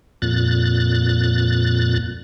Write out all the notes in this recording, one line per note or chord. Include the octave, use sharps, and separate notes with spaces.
F2 A#2 F#6 A6